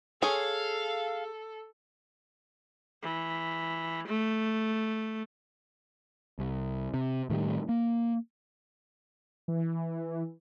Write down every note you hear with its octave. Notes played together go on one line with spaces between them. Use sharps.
G#4 A4 C#5 F5 G#5 C6
E3
A3
C2
C3
A2 D#3 F3 G3
A#3
E3